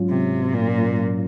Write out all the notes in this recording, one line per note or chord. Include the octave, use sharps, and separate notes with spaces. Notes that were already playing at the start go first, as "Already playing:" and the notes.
Already playing: G#2 F#3 C#4 F4
C3
A#2